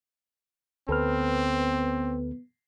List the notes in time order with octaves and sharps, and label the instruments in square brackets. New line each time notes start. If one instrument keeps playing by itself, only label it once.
[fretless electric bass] D2 [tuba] B3 [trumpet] C4 [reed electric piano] A4 B4 F6